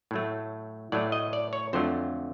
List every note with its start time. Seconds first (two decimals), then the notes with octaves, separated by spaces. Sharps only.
0.11 A2 F#3 A3
0.92 A2 F#3 A3 D5
1.12 D#5
1.33 D5
1.53 C#5
1.73 F2 D3 F#3 A3 C5